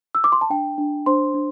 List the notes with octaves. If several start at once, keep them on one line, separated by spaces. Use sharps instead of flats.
E6
D6
C6
A5
D4 G5
D4
D4 C5 C6
D4